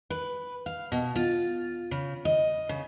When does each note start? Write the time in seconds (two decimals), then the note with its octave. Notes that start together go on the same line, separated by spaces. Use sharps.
0.10 B4
0.66 F5
0.92 B2
1.15 F4
1.91 C#3
2.25 D#5
2.69 C#3